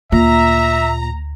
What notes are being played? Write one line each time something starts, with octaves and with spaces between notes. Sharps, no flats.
D2 A#2 E5 A#5